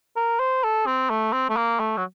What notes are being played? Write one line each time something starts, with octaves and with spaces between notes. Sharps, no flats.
A#4
C5
A4
C4
A3
C4
A3
A#3
A3
F#3